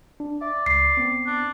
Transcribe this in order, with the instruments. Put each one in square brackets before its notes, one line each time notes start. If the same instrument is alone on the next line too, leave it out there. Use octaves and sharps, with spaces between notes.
[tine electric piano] D4
[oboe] D5 [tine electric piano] E5
[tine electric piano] C#2 [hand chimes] C7
[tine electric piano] B3 C4
[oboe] D4